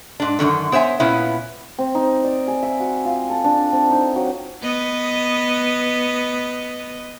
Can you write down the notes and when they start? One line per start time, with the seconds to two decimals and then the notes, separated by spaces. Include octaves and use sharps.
0.20 G#2 D4
0.39 F#2 A2 D3 D#3
0.72 B3 C5 C#5 E5 G#5
1.00 A#2 B3 C#4 E4
1.78 C4
1.95 D#4
2.24 D5
2.48 G#4
2.63 E5
2.80 F#4
3.05 F4
3.30 A4
3.44 D4
3.72 C4
3.90 D#4
4.15 F#3
4.63 B3 B4 D#5